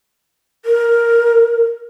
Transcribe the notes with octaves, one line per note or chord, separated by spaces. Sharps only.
A#4